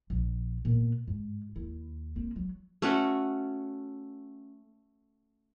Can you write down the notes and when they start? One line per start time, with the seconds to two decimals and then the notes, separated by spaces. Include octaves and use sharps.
0.10 A#1
0.65 A#2 B3
1.08 G#2
1.56 D#2 E4
2.16 A#3 C4
2.36 F#3
2.82 A3 C#4 F#4